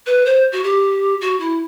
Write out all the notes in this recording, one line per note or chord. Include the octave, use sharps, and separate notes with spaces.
B4
C5
F#4
G4
F#4
E4